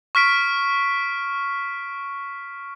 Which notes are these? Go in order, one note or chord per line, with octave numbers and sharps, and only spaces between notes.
C#6 F6 B6 D7